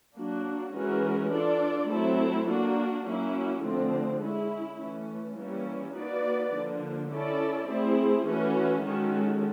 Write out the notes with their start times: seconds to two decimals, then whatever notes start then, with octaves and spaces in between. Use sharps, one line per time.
0.17 F#3 A#3 D4 F#4
0.75 E3 G#3 C#4 F#4 A#4
1.33 D4 F4 A4 D5
1.90 F#3 A3 C4 E4 A4
2.48 A#3 D4 F#4
3.06 F#3 A#3 C#4 E4
3.64 D3 F3 A3 C4
4.21 G#3 C#4 E4
4.79 E3 A3 C#4
5.37 E3 G3 A#3 C#4 E4
5.95 A#3 D#4 F#4 B4 D5
6.53 D3 F3 A#3
7.10 C#4 E4 A4 D5
7.68 A3 C4 E4 G#4
8.27 E3 A3 C#4 F#4
8.84 D#3 G#3 C#4 F#4 A4